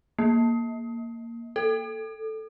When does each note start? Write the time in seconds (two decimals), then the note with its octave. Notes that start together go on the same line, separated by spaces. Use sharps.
0.19 A#3
1.56 A4